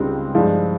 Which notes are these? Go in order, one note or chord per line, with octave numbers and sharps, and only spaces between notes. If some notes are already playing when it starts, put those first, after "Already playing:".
Already playing: C#2 C#3 G3 C4 D#4
G2 F3 G#3 D#4